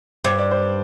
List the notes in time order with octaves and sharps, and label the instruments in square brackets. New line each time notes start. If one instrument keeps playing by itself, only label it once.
[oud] G2 [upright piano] C5
[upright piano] D5
C5